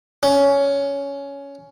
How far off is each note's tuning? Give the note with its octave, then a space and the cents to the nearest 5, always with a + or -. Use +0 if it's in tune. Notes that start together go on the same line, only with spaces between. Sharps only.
C#4 +15